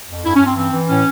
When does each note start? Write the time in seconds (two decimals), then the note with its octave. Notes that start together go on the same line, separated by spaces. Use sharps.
0.08 F2
0.24 G2 E4
0.35 C#4
0.40 G2
0.46 C4
0.56 E3 C4
0.73 E3
0.88 A2 C#4